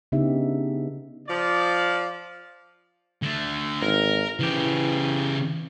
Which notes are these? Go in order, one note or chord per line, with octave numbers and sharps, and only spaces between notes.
C#3 B3 D4 D#4 G4 E5
F3 D5
D3 A3
G#1 A#4
C#3 E3 G4